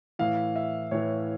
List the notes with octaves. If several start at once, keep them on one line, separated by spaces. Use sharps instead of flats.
A2 E3 F5
E5
A2 E3 C#5